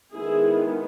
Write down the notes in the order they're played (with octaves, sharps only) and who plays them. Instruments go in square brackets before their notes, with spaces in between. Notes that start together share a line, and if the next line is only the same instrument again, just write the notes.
[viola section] D#3 G#3 B3 E4 G#4